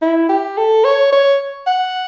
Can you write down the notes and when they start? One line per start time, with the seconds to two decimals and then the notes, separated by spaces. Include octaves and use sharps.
0.02 E4
0.29 G4
0.57 A4
0.85 C#5
1.12 C#5
1.67 F#5